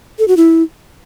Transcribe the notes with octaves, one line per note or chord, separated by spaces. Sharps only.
A4
F#4
E4